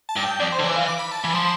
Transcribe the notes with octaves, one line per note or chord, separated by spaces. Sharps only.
A5
G2
G5
F2 D5
C5
D3
E3 D5
F5
D6
B5
A5
E3 B5
F3 C6